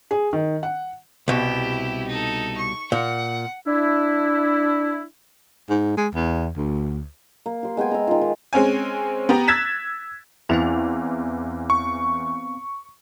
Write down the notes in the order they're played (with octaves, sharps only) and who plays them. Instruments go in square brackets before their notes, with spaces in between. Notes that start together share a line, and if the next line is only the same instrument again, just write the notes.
[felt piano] G#4
D#3
F#5
[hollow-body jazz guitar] C2 B2 [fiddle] E4 G4
[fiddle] D#4 A4
C#6
[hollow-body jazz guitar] A#2 [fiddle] F#5
[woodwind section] D4 E4
[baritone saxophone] G#2
G#3
E2
D2
[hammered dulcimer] A#3
G4 C6
G#3 B3 G5 G#5
E5 A#5
D#3 F4
D#3
[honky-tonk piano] G#3 C4 C#4 G#5
B3 G4 A#5
E6 F#6 G#6 A6 B6 E7
[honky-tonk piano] E2 E3 F7 [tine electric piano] B3 C4 F5
[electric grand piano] C#6